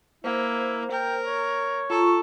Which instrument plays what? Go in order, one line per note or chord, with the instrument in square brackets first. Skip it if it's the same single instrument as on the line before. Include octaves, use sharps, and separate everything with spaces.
[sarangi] A#3 [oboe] E4 [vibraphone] C5
[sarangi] A#4 [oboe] G5
[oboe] C#5
[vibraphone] F4 A#5 C#6 [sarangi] A4